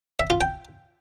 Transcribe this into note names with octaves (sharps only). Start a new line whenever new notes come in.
E5
F4
G5